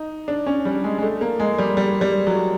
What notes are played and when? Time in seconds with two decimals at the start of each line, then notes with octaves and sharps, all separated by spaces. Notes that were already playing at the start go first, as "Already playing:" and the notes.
Already playing: D#4
0.28 D4
0.46 C#4
0.65 G3
0.84 G#3
0.98 G#3
1.02 A3
1.21 A#3
1.40 G#3
1.58 G3
1.77 G3
2.01 G3
2.27 F#3